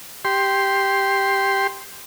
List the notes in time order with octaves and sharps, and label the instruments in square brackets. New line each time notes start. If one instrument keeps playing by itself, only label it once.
[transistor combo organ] G4 C6